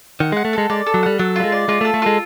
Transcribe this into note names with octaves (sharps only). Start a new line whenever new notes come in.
D#3 F#5
G#3 F#5
A3
G#3 A4
G#3 D5
A4
F#3
G3 F#5
F#3 A4
G3 F4
G#3
D5
G#3 F4
A3 A4
A3
G#3 F4